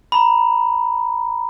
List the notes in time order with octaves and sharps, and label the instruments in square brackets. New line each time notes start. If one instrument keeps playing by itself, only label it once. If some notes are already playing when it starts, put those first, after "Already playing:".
[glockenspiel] A#5 B5